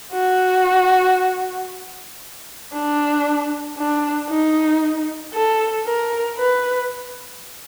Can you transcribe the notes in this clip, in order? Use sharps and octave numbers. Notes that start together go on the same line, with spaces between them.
F#4
D4
D4
D#4
A4
A#4
B4